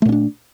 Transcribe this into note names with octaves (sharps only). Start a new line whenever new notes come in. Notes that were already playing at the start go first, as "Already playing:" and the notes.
A#2 A3 C#4 D4